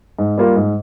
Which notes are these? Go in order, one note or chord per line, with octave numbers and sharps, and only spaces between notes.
G#2
G3 A#3 F4
G#2